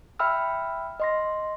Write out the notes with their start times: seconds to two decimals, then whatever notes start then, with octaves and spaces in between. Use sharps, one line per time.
0.19 E5 G5 B5 E6 F6
1.00 D#5 C6 A#6